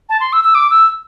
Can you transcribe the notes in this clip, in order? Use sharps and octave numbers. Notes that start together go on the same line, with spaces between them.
A5
C6
E6
E6
D6
E6